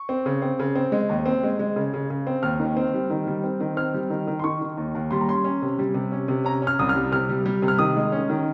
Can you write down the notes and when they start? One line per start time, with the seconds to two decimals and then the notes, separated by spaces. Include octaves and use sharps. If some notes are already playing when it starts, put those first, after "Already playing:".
Already playing: C#6
0.09 C4
0.26 C#3
0.42 C4
0.59 C#3
0.75 C4
0.92 G#3
1.09 D#2
1.26 C4
1.43 G#3
1.59 G#3
1.76 C#3
1.94 C#3
2.10 C#3
2.27 C4
2.43 D#2 F6
2.60 D#3
2.77 C4
2.94 G3
3.10 D#3
3.27 G3
3.44 C4
3.61 D#3
3.77 C4 F6
3.94 G3
4.10 D#3
4.27 D#3
4.39 C6
4.44 D#3 C#6
4.62 D#3
4.77 D#2
4.95 D#2
5.11 G3 C6
5.21 A#5
5.28 C#4 C6
5.44 C#4
5.62 C3
5.79 G3
5.94 C3
6.12 C#4
6.28 C3
6.45 C#4 A#5
6.62 C#4
6.67 F6
6.79 C2 D#6
6.89 F6
6.95 G3
7.12 C3 F6
7.29 G3
7.46 G3
7.62 C3
7.68 F6
7.79 D#3 D#6
7.97 G#3
8.12 C#4
8.30 D#3